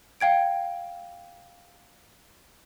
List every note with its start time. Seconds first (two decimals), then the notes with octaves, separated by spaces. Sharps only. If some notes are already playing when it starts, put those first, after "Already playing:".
0.20 F5 G5 G#6 D7